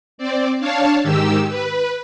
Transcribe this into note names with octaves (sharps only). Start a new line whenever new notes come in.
C4 D5
D4 C#5 F5 A5
G#2 D#3 G4 E6
B4